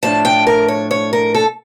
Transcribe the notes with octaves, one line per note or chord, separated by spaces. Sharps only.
A2 F3 A3 D4 A5
G5
A#4
C#5
C#5
A#4
A4